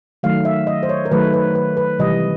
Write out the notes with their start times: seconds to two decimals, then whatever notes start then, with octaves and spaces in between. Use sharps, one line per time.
0.23 D#3 F#3 A3 F5
0.45 E5
0.67 D#5
0.83 C5
0.89 C#5
1.05 A#4
1.11 D#3 F#3 A3 B4
1.34 B4
1.55 B4
1.77 B4
1.99 C3 E3 G3 D#5